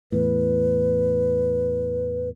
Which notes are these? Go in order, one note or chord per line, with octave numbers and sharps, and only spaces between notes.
E2 A2 B4